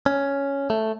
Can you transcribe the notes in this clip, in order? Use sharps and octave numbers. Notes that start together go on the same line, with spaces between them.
C#4
A3